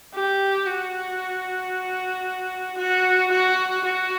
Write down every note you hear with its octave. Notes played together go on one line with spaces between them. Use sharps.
G4
F#4
F#4
F#4
F#4